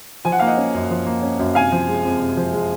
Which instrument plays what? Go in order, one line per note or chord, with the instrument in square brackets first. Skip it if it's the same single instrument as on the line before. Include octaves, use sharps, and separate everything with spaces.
[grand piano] F3 [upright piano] G#5
[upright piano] F#5
[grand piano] A#3 [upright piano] F5
[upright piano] D#5 F#5
[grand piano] C#4
F#2
F3
A#3
C#4
F#2
[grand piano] C3 [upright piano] F5 G#5
[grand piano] F3
G#3
F2
C3
F3
G#3